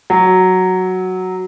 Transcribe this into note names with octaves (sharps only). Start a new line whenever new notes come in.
F#3